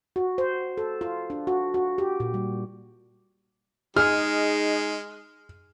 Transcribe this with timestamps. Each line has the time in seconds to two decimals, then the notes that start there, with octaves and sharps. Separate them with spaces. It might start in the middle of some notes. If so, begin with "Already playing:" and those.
0.16 F#4
0.38 C5
0.78 A4
1.01 F4
1.30 D4
1.47 F#4
1.74 F#4
1.98 G4
2.20 A#2
2.34 G3
3.96 G#3 D#4 G#4 F6